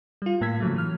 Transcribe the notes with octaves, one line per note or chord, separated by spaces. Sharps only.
G3 F4
A2 A#3 E6 G#6 B6
C#3 F3 F#3 A3
E3 F#3 F6